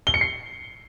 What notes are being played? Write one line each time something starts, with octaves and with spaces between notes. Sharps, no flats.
G7
C#7
C7